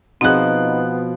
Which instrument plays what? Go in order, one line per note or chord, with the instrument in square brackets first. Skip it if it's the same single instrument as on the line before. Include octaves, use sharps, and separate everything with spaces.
[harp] B2 F3 [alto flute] B3 [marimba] C4 G#4 [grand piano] D#4 F#6